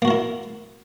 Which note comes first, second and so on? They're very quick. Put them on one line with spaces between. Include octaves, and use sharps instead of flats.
A#3 F#4 A#4 E4